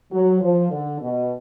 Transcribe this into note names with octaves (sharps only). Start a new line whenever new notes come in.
F#3
F3
D3
B2